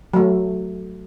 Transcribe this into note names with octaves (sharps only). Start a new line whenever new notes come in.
F#3 A3